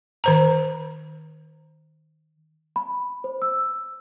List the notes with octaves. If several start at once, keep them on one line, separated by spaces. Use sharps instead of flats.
D#3 C5 A#5
B5
C5
E6